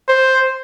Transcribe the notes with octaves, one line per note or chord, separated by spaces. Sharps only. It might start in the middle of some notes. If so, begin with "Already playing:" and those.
C5